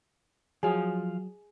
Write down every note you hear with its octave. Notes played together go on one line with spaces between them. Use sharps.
F3 F#3 G#4 F5